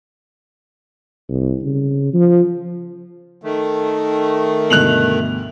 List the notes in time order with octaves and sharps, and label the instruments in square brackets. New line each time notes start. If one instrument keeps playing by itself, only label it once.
[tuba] C2
C#3
F3
[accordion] D#3 A3
[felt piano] D2 G2 B2 [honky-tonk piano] F#6 F7 F#7